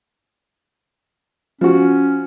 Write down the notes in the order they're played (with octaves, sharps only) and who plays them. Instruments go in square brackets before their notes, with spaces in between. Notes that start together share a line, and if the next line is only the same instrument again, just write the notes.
[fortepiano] F3 F#4 [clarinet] C#4